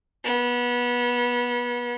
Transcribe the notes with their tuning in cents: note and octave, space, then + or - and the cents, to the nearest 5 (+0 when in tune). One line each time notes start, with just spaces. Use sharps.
B3 -25